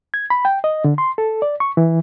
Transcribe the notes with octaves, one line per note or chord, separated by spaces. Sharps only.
G#6
B5
G5
D#5
D3
C6
A4
D5
C#6
E3